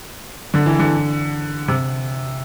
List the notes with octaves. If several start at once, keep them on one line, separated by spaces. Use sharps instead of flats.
D3
E3
D3
C3